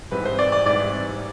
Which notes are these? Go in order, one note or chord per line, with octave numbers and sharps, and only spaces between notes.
G#2 E3 G3 C4 B4
C5
D5
D5
G#2 E3 G3 C4 D5